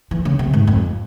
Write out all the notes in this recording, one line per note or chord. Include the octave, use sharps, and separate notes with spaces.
E3
C#3
C3
G#2
F2